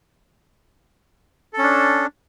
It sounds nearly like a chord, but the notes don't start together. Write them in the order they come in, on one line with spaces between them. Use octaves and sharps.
A4 C#4 D4